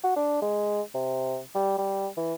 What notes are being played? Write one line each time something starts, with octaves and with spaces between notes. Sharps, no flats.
F#4
D4
G#3
C3
G3
G3
E3